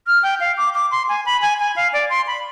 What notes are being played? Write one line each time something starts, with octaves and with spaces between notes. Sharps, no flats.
F6
G5
F5
D6
D6
C6
G#5
B5
G#5
G#5
F5
D5
C6
B5